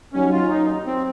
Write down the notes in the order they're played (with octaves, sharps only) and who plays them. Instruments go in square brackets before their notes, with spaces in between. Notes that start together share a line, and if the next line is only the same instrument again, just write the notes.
[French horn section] D#2 D#3 F#3 [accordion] C#4
[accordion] F4
D#4
C4